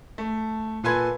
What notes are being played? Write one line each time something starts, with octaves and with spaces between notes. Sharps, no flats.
A3
A#2 A4 B4 G#5 C6 G#6